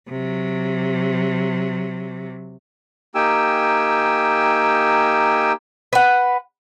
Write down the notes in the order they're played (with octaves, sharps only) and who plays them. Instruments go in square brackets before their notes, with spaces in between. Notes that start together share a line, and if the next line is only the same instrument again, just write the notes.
[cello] C3 F#3
[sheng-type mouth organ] A#3 D#4 G4 G5 G#5 E6
[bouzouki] B4 F#5